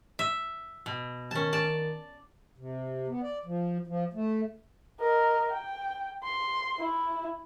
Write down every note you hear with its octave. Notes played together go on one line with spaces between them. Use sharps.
E5
B2
D#3 C#4 A5
D5 A5
C3
B3
D5
F3
F3
A3
A#4 D#5
G5
C6
E4